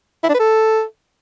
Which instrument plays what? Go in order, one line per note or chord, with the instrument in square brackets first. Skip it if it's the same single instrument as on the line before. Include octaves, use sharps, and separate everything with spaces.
[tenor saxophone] E4
D4
B4
A4